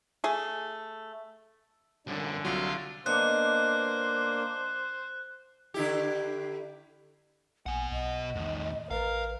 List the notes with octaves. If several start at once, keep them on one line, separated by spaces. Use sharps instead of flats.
A3 G#4
C2 F#2 D3
C2 F#3 F4
A#3 B3 D4 C5 D#5 F#6
D3 E4 G4
A#1 B2 F#5 G#5
B1 D#5
E2 A2 D#3
A1 A#4 B4 F5